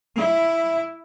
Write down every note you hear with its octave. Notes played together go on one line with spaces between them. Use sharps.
E4